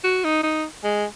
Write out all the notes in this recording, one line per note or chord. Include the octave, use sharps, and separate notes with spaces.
F#4
D#4
D#4
G#3